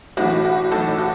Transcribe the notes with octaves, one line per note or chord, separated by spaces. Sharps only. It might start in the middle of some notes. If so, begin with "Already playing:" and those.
B1 A2 E3 D4 F#4
F#4
B1 A2 E3 D4 A4
F#4